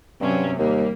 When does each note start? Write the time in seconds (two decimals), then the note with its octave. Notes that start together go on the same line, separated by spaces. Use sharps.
0.21 G2 C3 F#3 C#4
0.59 D#2 G3 A#3